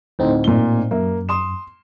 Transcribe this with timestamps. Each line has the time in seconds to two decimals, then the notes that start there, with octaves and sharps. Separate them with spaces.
0.19 D2 A2 C4 D#4
0.44 A#2 G7
0.91 F#2 A#3 E5
1.29 C6 D#6 E7